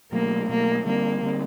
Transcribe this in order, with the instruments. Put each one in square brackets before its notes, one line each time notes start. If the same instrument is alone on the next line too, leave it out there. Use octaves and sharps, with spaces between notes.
[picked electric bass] B2 F#3 A3 [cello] A#3
[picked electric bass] B2 F#3 A3 [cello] A#3
[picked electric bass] D3 G3 C4 [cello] A#3
[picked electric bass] D3 G3 C4